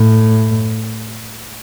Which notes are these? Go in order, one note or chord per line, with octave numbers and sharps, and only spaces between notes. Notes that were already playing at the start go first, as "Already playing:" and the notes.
Already playing: A2